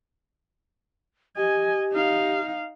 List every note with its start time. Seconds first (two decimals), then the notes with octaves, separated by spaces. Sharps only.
1.37 G4 D#5 G#5
1.93 D#4 F5